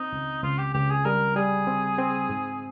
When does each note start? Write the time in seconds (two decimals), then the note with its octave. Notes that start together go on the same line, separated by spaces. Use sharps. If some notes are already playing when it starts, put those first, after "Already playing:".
Already playing: C4 D#4
0.12 C#2
0.43 C#2 F4
0.58 G4
0.74 C#2 G4
0.90 G#4
1.05 G3 A#4
1.36 G3 G#4
1.67 C4
1.98 C4
2.29 G#2